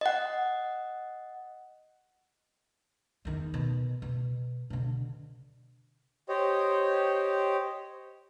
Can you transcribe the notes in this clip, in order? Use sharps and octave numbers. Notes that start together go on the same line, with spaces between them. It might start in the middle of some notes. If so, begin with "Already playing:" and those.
D#5 F#5
E2 D#3
B2
B2
B2 D3
G4 C5 C#5 D#5